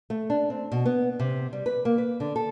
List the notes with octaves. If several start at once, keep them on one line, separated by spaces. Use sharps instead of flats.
A3
D4
C4
B2
B3
C3
G3
B4
A#3
B4
D3
A4